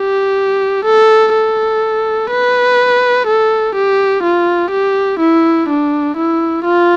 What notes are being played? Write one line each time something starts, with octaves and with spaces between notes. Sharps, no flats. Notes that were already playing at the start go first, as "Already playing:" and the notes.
Already playing: G4
A4
A4
B4
A4
G4
F4
G4
E4
D4
E4
F4